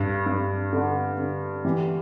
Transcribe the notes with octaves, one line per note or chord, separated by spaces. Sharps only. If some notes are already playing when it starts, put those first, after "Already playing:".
Already playing: G2
G2
D3
D3
E3 G4